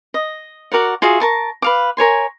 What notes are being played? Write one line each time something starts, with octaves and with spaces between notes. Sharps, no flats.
D#5
F#4 A#4 D5 F#5
F4 F#4 G#4 E5
A#4 A5 C#6
B4 F5 D6
A#4 C#5 G#5 C6